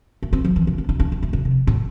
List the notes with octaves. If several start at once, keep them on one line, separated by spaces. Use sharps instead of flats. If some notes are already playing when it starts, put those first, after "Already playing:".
A3
C4
F3
E3
D3
C4
D4
D4
C4
A3
D3
C3
A2